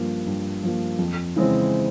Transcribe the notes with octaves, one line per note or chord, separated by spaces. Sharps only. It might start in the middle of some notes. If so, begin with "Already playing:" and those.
Already playing: G2 F3 A#3
G2
F3 A#3
F2
C#3 E3 G#3 C4